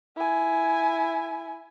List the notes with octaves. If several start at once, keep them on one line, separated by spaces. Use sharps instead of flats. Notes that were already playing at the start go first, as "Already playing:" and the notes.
E4 G#5